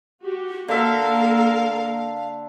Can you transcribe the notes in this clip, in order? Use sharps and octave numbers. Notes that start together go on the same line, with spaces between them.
F#4 G4
D3 A#3 A4 A#4 E5 F5